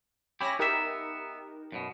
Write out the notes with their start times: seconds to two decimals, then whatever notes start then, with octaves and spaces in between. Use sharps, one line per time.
0.41 C#4 E4 G4 B5 A#6
0.59 B3 D#4 G4 A#4 E5
1.72 F#2 B2